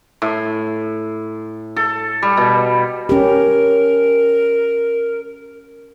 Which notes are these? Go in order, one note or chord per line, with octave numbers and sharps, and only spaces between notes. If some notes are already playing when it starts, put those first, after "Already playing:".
A2
A4
G3
B2
C#4 G4 A#4